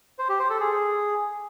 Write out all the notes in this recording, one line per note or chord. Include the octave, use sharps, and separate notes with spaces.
C5
G4
C5
A4
G#4